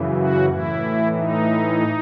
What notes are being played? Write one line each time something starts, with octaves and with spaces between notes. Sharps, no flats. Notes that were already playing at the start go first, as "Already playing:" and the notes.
Already playing: F#2 C#3 E3
F#4
A2 E3 E4
D#4